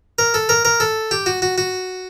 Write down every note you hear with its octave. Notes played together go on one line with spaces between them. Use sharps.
A#4
A4
A#4
A#4
A4
G4
F#4
F#4
F#4